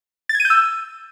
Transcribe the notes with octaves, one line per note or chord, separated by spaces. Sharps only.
A6
G#6
D#7
G6
E6